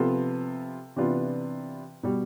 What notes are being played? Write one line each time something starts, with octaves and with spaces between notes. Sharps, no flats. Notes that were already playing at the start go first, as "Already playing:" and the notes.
Already playing: C3 F3 B3 F4 A4
C3 E3 B3 D4 F4
B2 G3